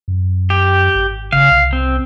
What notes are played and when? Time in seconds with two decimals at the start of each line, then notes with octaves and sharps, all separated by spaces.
0.08 F#2
0.50 G4
0.95 G#1
1.33 C#3 F5
1.51 C2
1.73 C4